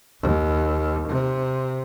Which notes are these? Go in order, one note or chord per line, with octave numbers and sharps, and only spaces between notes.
D#2
C3